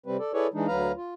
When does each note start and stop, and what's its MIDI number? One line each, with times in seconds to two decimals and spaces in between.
0.06 0.17 48
0.06 0.17 55
0.06 0.17 60
0.06 0.17 71
0.19 0.32 69
0.19 0.32 74
0.33 0.47 64
0.33 0.47 68
0.33 0.47 69
0.33 0.47 71
0.33 0.47 73
0.33 0.47 74
0.54 0.67 52
0.54 0.67 56
0.54 0.67 62
0.54 0.67 63
0.67 0.92 38
0.67 0.92 54
0.67 0.92 71
0.67 0.92 77
0.67 0.92 82
0.96 1.14 65